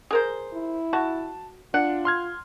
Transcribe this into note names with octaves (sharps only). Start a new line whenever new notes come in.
G#4 A#4 C5
E4
F#4 A5
D4 F4 F#5
C6 F6 G#6